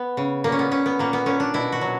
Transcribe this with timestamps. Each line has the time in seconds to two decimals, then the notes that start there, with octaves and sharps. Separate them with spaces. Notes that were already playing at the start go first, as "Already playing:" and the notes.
Already playing: B3
0.17 C#3
0.44 A#2 A#3
0.52 C#4
0.59 B3
0.71 A#2 C#4
0.86 B3
0.99 A#2 A#3
1.13 B3
1.26 A#2 C#4
1.40 D4
1.54 B2 E4
1.72 F#4
1.81 F#3